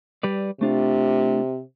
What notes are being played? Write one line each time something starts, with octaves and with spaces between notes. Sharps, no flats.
G3 B4 D5
C3 A3 D4 F4